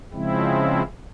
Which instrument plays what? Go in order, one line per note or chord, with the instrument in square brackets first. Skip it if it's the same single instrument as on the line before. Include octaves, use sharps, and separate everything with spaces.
[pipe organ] C#3 F3 G#3 C4 E4